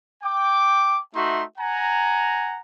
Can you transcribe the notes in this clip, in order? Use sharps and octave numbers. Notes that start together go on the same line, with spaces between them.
G5 D6
A3 D#4 F#4 E5 C6
F#5 G#5 A#5